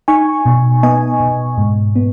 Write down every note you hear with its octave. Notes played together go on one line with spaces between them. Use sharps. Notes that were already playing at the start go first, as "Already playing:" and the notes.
D#4 G#5 C#6
B2
B3 D#5 G#5
B2
G#2
B3